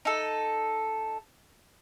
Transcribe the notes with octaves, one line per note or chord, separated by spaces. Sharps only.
D#4 A4